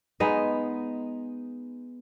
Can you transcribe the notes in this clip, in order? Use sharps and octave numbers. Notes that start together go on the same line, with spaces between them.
G#3 B3 D#4 D#5